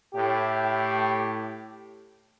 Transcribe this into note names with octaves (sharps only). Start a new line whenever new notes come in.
A2 G4